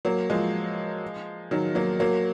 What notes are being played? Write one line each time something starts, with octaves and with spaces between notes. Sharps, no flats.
F#3 A#3
F3 G#3
D#3 F#3
F#3 A#3
F#3 A#3